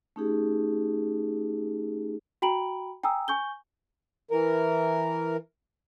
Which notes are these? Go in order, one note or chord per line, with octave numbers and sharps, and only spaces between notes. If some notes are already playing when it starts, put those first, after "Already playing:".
A3 C#4 D#4 G4 G#4
F#4 G5 A#5 B5 D7 F#7
G5 G#5 A#5 D#6 E6
G#5 C#6 G6 G7
E3 A#4